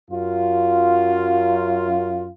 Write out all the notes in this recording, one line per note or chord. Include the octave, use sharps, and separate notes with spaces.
F#2 F4